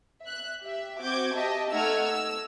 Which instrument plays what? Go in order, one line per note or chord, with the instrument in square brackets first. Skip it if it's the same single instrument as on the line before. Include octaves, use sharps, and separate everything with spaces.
[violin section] E5 F#6
G4 E5
C4 F#4 D6 G6 G#6
G4 D#5 E5 A5
A3 D#4 F#5 E6 F6 G#6
E6